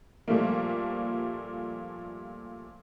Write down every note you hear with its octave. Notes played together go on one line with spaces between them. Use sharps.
A#2 F3 G3 A3 A#3